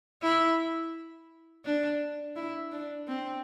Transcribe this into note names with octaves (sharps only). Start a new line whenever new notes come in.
E4
D4
E4
D4
C4